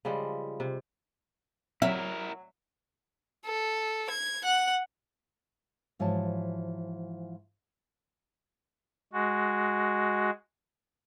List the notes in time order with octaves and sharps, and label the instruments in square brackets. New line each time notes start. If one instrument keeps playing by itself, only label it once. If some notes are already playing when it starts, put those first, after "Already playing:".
[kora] C#3 F3 G3 G#3
C3
[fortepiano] F#3 [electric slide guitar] E4 A#4 [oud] E5
[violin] A4
G#6
F#5 F#6
[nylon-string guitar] G#2 E3 F3 F#4 C#5 A5
[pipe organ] G#3 F#4